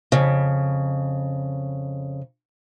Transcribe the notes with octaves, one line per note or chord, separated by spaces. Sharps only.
F2 C#3